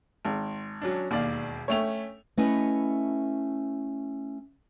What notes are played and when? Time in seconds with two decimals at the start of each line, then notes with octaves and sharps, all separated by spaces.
0.25 G#1
0.82 F#3 C#4 D4
1.11 E1 D#2 D5 F5
1.68 A3 C#4 C#5 G5 F7
2.37 A3 C#4 E4 B4 D#5